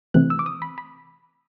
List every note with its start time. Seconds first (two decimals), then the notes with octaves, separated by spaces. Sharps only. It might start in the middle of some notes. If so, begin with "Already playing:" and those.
0.14 C3 E3 A3 C4 E4 F#6
0.30 E6
0.39 D6
0.46 D#6
0.62 B5
0.78 B5